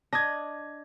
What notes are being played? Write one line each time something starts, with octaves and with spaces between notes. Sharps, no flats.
D4 D#5 G#6 A#6